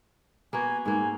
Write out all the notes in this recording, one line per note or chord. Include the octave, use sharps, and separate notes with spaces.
A#3 B3 F#4 G#5
G#2 A#3 C4 G#5